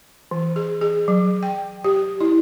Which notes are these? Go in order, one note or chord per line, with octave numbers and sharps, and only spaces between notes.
E3
G#4
G#4
F#3
G5
G4
E4